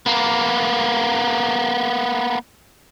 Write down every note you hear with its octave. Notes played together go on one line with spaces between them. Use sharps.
A#3 B3